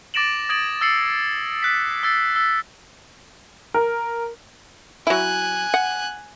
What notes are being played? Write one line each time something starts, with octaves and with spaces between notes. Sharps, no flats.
D6 A6 A#6 D7 E7 F#7
D#6 G#6 A6 D7 F#7
E6 A6 C7 C#7 F#7
F#6 B6
E6 A6 C7
E6 B6
A#4
F#3 E4 G#5 F#6
F#5